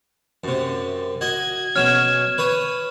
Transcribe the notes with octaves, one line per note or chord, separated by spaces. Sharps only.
F#2 C3
F#4 D#5 G#6
B2 F#3 C#4 F6 E7
B4 C#5 D#6